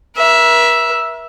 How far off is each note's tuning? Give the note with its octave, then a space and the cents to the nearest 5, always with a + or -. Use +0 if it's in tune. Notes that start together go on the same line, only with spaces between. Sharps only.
A#4 +45 E5 +0